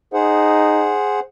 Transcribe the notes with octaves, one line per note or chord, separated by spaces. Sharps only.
D#4 G#4 C5 F#5